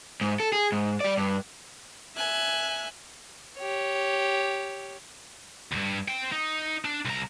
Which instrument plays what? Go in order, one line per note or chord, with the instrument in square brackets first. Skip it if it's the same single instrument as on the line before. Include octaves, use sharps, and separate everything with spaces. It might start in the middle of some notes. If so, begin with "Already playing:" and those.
[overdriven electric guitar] G#2
A4
G#4
G#2
G3 D5
G2
[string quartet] E5 G#5 F#6
[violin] G4 C#5
[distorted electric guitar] D2 G2
C5 G5
D#4
D4
C2 A#5